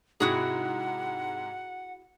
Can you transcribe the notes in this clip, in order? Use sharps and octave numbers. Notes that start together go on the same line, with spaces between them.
G#2 C3 E4 F#4 G#4 F#5 F#6